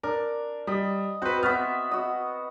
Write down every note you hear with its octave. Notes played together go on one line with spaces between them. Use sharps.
D4 A#4
G3 D#5
C4 F#4 B4 C5
B3 F#4 E5 F6
F#4 D#5